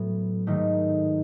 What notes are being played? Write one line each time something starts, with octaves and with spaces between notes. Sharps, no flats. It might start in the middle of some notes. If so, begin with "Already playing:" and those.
Already playing: A2 F#3 B3
G#2 D#3 A3 D#4